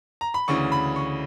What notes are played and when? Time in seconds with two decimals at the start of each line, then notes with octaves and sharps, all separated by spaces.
0.21 A#5
0.34 B5
0.48 D2 C#3 E3 C#6
0.72 B5
0.96 C#6